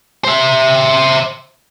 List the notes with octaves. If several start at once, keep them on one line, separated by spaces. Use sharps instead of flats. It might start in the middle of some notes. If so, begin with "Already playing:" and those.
C5 E5